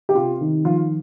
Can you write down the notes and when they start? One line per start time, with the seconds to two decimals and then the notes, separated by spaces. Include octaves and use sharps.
0.09 G4
0.15 C3 F4
0.41 D#3
0.65 F3 F4